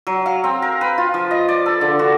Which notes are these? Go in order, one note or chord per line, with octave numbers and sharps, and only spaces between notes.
F#3
F5
C4
A#4
B4
F4
F3
D#5
D5
A4
D3
F#4